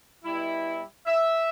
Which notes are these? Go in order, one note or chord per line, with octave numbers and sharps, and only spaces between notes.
B2 G3 E4
E5